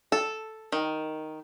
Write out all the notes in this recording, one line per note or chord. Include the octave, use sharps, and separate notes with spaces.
A4
D#3